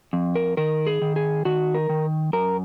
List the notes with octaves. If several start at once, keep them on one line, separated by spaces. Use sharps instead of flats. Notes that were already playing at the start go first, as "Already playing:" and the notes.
F2
A#4
D#3 A#4
G#4
D#3
G#4
D#3 F#4
A#4
D#3
F#2 A#4